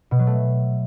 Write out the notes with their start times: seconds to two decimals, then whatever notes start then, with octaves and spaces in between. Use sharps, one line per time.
0.11 B2
0.19 F#3
0.27 A3